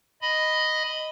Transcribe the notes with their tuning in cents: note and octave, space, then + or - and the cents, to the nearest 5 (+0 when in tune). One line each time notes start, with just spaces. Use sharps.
D#5 +0 B5 +10